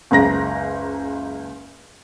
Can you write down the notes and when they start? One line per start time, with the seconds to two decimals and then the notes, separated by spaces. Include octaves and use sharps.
0.11 F#1 C#2 A#5 A#6